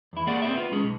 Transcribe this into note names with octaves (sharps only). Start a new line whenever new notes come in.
E2 E4
A#3 G#4 D5 F#5
C4 G#4 A4 D5 E5
B3 F4
G#3 C#4 G#4
B1